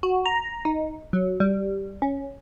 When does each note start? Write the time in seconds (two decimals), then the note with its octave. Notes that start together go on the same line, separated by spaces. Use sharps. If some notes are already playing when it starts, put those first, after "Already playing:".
0.03 F#4
0.26 A#5
0.65 D#4
1.13 F#3
1.40 G3
2.02 C#4